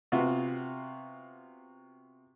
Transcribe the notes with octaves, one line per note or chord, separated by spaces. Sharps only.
C3 B3 F4 F#4